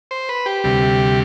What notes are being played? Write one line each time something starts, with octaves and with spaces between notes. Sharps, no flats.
C5
B4
G4
D2 C3 G3